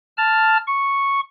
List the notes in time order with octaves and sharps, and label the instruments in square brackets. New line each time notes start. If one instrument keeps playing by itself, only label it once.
[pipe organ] A5 F6
C#6